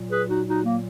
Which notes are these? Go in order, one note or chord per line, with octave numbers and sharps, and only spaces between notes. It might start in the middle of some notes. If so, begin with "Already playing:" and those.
Already playing: A#2 F#3
G#4 B4
D#4 F#4
D#4 F#4
A#3